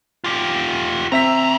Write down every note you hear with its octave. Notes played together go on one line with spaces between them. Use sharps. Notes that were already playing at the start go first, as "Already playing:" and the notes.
F4 G4
D2 C4 E5 A#5 B6